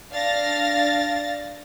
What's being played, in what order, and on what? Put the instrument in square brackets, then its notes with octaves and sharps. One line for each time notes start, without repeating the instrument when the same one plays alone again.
[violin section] D4 F5 A6 A#6